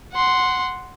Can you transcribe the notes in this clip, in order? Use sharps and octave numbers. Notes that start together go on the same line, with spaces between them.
F#5 C6